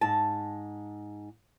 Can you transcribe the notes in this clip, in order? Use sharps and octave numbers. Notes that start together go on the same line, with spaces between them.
G#2 A5